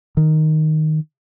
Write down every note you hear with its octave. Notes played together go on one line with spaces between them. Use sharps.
D#3